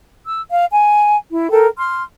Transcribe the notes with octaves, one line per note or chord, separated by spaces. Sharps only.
E6
F5
G#5
E4
A4 A#4 G5
C6 F6